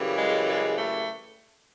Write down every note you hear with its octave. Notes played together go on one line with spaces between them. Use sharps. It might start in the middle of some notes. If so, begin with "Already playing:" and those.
Already playing: F#2 C#3 E3 G3
G#3
G#3
A3